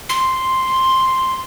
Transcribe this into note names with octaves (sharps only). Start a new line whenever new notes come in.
C6